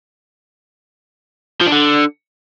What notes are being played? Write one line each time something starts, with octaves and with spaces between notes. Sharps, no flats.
F3
D4
D3